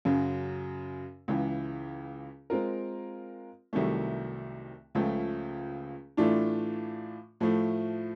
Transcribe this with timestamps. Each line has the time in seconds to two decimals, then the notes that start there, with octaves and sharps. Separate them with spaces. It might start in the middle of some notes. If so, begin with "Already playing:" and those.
0.05 F#2 C#3 F#3
1.28 C#2 C#3 E3
2.50 G#3 C4 F4 A#4
3.73 C2 C3 D#3 F#3 A3
4.95 C#2 C#3 F3 A3
6.17 A2 E3 A3 D4 F4
7.41 A2 F3 A3